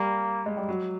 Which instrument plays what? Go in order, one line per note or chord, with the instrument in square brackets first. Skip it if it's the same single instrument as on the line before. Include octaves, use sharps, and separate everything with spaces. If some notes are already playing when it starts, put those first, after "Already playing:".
Already playing: [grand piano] G3 [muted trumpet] A#3
[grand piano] G#3
G3
F#3